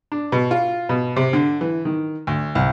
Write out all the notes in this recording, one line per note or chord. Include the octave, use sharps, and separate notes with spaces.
D4
B2
F4
B2
C3
D3
E3
D#3
D2
C2